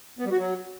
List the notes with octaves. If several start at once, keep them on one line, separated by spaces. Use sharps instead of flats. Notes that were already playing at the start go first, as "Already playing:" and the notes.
B3
G3
F#4
F#3